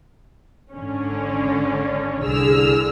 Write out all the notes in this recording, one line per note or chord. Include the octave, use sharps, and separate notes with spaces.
G#1 D3 C#4
C2 D3 G#4 E6 F6